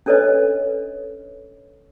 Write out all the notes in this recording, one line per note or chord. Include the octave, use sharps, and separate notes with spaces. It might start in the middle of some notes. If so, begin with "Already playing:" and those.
C#4 D4 A4 B4 C#5 D#5